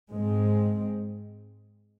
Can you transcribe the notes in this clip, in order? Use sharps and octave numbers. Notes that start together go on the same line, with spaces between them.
G#2 G#3 C4